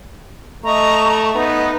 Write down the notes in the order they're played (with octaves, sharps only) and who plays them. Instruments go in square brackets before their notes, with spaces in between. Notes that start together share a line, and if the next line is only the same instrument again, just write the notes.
[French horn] A3 [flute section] D#5 A#5 C#6
[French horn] B3 [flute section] D#4